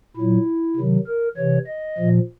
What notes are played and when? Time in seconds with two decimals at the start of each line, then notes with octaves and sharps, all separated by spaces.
0.16 A#2 F#3 E4
0.76 C3 D#3 F#3
1.07 A#4
1.37 C3 E3 C#5
1.67 D#5
1.98 A#2 F3